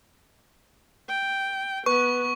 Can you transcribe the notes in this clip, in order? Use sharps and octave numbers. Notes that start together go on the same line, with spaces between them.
G5
B3 B4 C#6